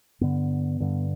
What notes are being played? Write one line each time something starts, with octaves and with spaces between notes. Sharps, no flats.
G2 D3 B3
G2 D3